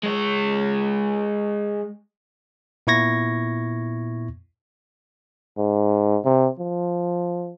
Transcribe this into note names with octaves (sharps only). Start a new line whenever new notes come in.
G#3 C#5
A#2 B3 E4 C#6 G#6 A#6
G#2
C3
F3